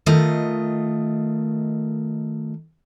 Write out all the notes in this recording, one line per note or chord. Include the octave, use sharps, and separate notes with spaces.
D#3 A3 F4 D#5